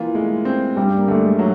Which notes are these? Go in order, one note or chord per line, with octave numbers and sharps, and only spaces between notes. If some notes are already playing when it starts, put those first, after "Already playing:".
Already playing: E3 A#3 B3 F4
G#3 A3
C4
G2 G3
A#3
D3 A3
G#3
F#3